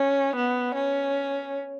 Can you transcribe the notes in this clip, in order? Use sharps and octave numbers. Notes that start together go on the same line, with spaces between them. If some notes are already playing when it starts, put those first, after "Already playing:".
Already playing: C#4
B3
C#4